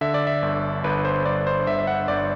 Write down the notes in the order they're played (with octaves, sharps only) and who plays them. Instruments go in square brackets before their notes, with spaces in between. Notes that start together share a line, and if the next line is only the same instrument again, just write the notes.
[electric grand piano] D3 E5
D5
E5
G1
G1 B4
C5
G1 D5
C5
G1 E5
E5
F#5
G1 D5